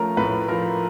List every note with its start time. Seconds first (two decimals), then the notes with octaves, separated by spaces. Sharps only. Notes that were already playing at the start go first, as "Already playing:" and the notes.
Already playing: F3 A3 C#4 A#4 A#5
0.17 A2 B4 B5
0.48 F3 A#4 A#5